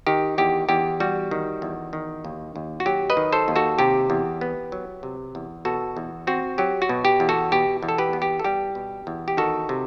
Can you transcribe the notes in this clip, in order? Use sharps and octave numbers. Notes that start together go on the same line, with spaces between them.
D#3 G4
E2 G4
E2 G4
G3 F#4
D#3
E2
D#3
D#2
D#2
F#4
F#3 G4
B4 D#5
D#3
A4 C5
D#2
F#4 A4
C3 G4
E2
B3
F#3
C3
E2
B2 F#4 A4
E2
C4 F#4
F#3 G4
F#4
B2
G4
E2
F#4 A4
B2 G4
E2
A4
G4 B4
B3
G4
A4
G3 G4
B2
E2
G4
D#3 F#4 A4
C3